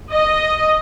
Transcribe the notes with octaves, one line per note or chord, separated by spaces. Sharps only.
D#5